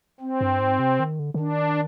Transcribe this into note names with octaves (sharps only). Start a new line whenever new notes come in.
C4
G2
G#2
C3
D#3
D3
D3
D#3 D4